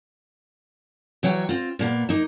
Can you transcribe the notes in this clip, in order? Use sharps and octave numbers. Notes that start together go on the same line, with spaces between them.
E3 F#3 C#5 G5
C4 F4
A#2 A#3 B3
A#3 D#4